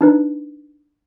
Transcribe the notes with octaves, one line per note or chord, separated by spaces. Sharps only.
D4 D#4 B4